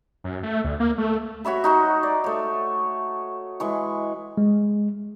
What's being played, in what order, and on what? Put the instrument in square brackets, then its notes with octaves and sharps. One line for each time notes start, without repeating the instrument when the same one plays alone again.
[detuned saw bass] F#2
A3
D2
A#3
A3
[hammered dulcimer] F#4 C#5 E5 B5
D#4 F#4 C6
D5
A3 C#5
E3 G#3 C#6
[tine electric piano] G#3